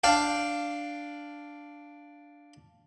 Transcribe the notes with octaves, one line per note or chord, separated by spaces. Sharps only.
D4 D5 F5 G5